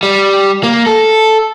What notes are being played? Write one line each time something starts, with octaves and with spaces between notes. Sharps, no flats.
G3
A#3
A4